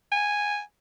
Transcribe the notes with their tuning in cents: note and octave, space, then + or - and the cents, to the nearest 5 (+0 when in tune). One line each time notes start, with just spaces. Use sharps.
G#5 -5